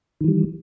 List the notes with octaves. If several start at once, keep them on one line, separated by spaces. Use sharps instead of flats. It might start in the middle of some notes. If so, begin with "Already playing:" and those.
D#3 E3 G3